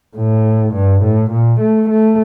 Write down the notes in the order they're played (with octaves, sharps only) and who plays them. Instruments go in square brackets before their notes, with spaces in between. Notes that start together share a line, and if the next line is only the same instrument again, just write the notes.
[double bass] A2
G2
A2
A#2
A3
A3